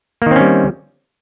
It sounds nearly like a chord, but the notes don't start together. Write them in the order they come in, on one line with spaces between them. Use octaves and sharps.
A#3 D#3 C4 C#4 G3